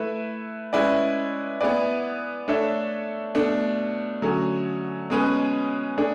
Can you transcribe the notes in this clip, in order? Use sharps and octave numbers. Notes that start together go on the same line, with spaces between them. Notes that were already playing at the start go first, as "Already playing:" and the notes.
Already playing: A3 E4 B4 E5
G#3 C#4 E4 B4 D5
B3 E4 G#4 B4 D5
A3 D4 A4 C#5 E5
B2 A3 D4
D3 F#3 A3 C#4 G#4
B2 G#3 C#4 G#4 B4
A3 D4 G#4